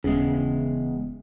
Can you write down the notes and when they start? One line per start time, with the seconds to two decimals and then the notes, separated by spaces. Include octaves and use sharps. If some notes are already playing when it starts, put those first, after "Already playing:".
0.04 D#1 E2 C#3 G#3